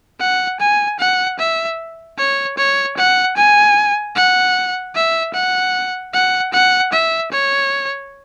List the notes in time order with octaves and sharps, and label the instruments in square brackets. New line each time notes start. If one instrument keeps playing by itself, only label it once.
[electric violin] F#5
G#5
F#5
E5
C#5
C#5
F#5
G#5
F#5
E5
F#5
F#5
F#5
E5
C#5